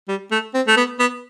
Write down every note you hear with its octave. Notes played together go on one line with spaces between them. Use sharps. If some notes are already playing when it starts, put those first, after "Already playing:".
G3
A3
C4
A3
B3
B3